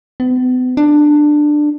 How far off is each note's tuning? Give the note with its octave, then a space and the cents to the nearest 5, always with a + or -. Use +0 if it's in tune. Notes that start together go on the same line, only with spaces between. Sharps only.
B3 +40
D4 +15